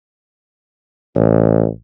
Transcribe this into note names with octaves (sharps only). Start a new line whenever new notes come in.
A1